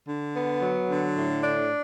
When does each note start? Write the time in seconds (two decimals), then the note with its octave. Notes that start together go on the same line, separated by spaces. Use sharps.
0.08 D3
0.35 B3
0.62 F#3
0.90 D3
1.15 A2
1.43 D4